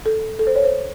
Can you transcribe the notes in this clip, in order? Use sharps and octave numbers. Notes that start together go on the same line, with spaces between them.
A4
A4
C5
C#5
C5